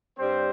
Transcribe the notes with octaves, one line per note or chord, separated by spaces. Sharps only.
G2 G3 C4 C5